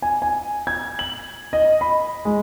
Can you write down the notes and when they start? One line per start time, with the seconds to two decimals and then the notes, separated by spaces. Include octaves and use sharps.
0.02 G#5
0.22 G#5
0.67 G#6
0.99 F#7
1.53 D#5
1.81 B5
2.25 G#3